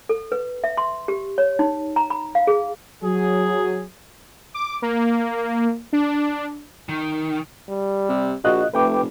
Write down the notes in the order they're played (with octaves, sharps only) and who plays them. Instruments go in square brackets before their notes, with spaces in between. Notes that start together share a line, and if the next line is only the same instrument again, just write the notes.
[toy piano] A4
B4
E5
C6
G4
C#5
D#4
A#5
B5
F5
G#4
[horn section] F#3 G#4
[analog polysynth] D6
A#3
D4
[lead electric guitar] D#3
[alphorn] G3
[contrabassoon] C3
[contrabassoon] A#1 [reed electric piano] F4 D#5 F#6 [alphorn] F#4
[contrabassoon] F1 [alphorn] A3 [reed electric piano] B4 G5 D6